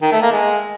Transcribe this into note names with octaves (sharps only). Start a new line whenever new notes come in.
D#3
A3
A#3
G#3